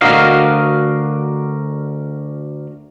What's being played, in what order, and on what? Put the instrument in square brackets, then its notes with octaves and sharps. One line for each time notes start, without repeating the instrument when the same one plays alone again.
[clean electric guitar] D2 D4 F#4 A#4 D#5 F5